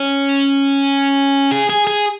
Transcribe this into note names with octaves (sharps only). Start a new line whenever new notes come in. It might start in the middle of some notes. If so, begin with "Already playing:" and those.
Already playing: C#4
G#4
G#4
G#4